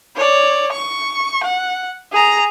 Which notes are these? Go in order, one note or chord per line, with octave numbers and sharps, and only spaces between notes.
C#5 D5
C#6
F#5
G#4 A#5